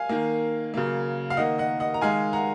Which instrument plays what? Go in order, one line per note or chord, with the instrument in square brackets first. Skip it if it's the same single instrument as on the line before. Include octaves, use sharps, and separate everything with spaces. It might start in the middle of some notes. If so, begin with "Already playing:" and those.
Already playing: [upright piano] F5 G#5
D#3 A#3
C#3 F#3 A#3
F5
D#3 A#3 D#5 F#5
D#5 F#5
D#5 F#5
A#5
D#3 G#3 F5 G#5
F#5 A#5